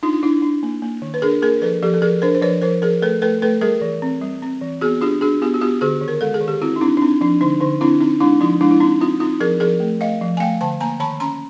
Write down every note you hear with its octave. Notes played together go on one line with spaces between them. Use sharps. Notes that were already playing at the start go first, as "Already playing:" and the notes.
D4 D#4 F4
F4
D4 E4
D4
A#3
A#3
D#3
B4
D4 G#4 A#4
A#3 G#4 A#4
F3 A4 B4
F3 G4 A4
A4
F3 G#4 A#4
D4 A#4 C5
C5
F3 B4 C#5
F3 A#4 C5
F3 G#4 A#4
A3 A4 B4
A3 A4 B4
A3 A4 B4
G3 G#4 A#4
E3
C4
G3
C4
E3
B3 F#4 G#4
D4 F4 G4
D4 F#4 G#4
B3 F4 G4
F#4
B3 F4 G4
D3 F#4 G#4
D#3
A#4
G#3 A4
G#4
D#3
G4
C4 E4 F#4
D#4
C4 D4 E4
D4
C4 D#4
F3 D4
D3 D#4
D3 D#4
C4 D4 E4
C4 D#4
G#3 D4 E4
F3 D#4 F4
G#3 D4 E4
E4
C4 D#4
C4 D#4 F4
C4 D#4 F4
F3 G#4 A#4
F3 G#4 A#4
A3
A3 D#5 F5
F3
G#5
A3 F5 G5
D3 G5 A5
A#3 G#5 A#5
D#3 A5 B5
C#4 A#5 C6